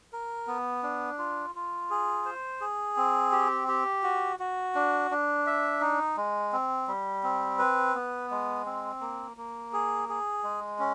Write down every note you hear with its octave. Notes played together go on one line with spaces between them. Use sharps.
A#4
B3
D4
F4
F4
G#4
C5
G#4
C4
G4
G4
F#4
F#4
D4
D4
E5
D#4
G#3
C4
G3
C4
B4
B3
G#3
C4
A#3
A#3
G#4
G#4
G#3
C#4